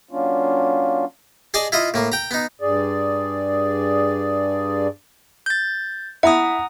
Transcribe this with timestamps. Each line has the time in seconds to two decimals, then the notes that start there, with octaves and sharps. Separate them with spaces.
0.11 F#3 A#3 C#4 D4 F4
1.54 G#4 D5 D#5 G#5 A5
1.72 E4 F4 D#5 D#6
1.94 A2 A#3
2.12 G5 A#5
2.31 B3 D#4
2.61 G2 G#4 D5
5.46 G6 A6
6.23 E4 F#5 A#5 D#6